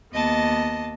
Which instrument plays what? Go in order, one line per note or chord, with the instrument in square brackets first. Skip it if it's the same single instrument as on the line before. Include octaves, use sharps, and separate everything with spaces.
[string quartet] D#2 B3 D#5 A5